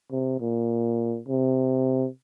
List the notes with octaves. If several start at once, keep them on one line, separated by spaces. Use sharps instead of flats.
C3
A#2
C3